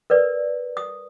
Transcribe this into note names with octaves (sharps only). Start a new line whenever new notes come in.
A#4 B4 D5
D#6